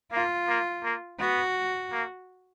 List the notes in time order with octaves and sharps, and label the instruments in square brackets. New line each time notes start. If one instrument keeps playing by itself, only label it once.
[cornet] A#3 [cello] F4
[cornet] A#3
A#3
[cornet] B3 [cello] F#4
[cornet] A#3